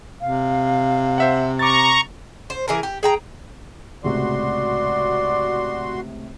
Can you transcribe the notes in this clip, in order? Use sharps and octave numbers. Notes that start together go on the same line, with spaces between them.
C3 F5
C5 E5 F#5
A#5 C#6 D6 A6
C5
E3 G#4 A#4
G4
G#4 G5 A#5
C#2 A2 C3 F#4 D5 C6